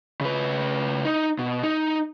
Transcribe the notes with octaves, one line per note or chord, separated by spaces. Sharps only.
C#3 B4
D#4
B2
D#4